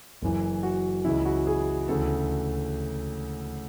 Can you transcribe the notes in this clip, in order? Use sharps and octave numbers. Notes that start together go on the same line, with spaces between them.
F#1 F#2 E3
F#4
C#2 C#3 E3 E4
F#4
G#4
D2 C#3 E3 A4